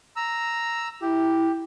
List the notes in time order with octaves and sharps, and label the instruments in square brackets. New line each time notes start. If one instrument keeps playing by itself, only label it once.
[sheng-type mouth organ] A#5 E6
[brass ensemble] E4 [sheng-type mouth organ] G4